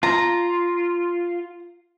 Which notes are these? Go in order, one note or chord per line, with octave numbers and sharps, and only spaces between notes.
F4 A#5